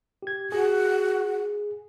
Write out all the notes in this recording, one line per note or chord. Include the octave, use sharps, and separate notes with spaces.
G4 G#6
F#4 G#4